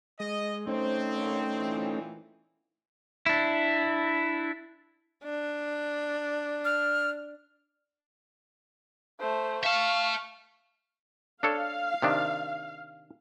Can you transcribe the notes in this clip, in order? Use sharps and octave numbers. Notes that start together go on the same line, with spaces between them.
G#3 D#5
A3 C4 C#4 D#4 C5
D3 A#3 C#5
A#2 E3
D4 E4
D4
F6
A3 C5
E5 F5 A5 C#6 F6
D4 A4 C#5 F5
C3 D#3 D4